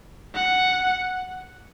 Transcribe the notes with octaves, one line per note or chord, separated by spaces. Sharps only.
F#5